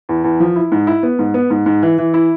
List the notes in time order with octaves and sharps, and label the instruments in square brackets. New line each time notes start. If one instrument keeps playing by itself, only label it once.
[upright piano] E2
E2
F3
E4
G#2
E4
B3
G#2
B3
G#2
G#2
E3
E3
E4